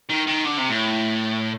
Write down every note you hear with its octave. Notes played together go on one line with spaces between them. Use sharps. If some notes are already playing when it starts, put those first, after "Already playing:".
D#3
D#3
D3
C3
A2